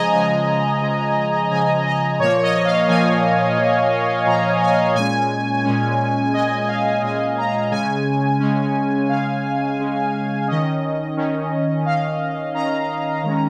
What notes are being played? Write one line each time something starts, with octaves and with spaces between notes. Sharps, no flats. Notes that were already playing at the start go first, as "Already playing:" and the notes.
Already playing: C#3 F3 G#3 D#5 G#5 A#5
C#3 F3 G#3 G#5
C#3 F3 G#3
C#3 F3 G#3 G#5
D#5
A#2 F3 A#3 C#5
D#5
F5
A#2 F3 A#3 G#5
A#2 F3 A#3
A#2 F3 A#3 A#5
G#5
A#2 G#3 C#4 G#5
A#2 G#3 C#4
A#2 G#3 C#4 D#5
F5
A#2 G#3 C#4 G#5
A#5
C#3 G#3 C#4 G#5
C#3 G#3 C#4
C#3 G#3 C#4 F5
C#3 G#3 C#4
D#3 C#4 D#5
D#3 C#4
D#3 C#4 F5
D#3 C#4 A#5
D#3 G#3 C#4